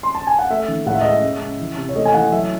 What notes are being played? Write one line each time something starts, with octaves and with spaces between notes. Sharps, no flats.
C6
A5
G#5
F#5
A3 E5
D#3
A2 F#5
E5
D#5
G#3 E5
G#3
C#3
E3
C3
C#5
A3 D#5
G#5
E3 F#5
F#3 E5